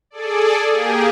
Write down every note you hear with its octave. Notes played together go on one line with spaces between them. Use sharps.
G#4 A4 D5
A#3 G4 G#4